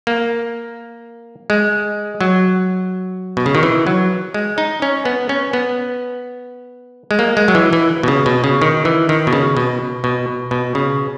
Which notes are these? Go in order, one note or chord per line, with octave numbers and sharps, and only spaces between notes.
A#3
G#3
F#3
B2
C#3
D#3
E3
F#3
G#3
D#4
C#4
B3
C#4
B3
G#3
A#3
G#3
F#3
E3
E3
B2
C#3
B2
C#3
D#3
E3
D#3
B2
C#3
B2
B2
B2
C#3